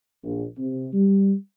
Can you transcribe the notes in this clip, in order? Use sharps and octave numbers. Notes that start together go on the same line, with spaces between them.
A#1
C3
G3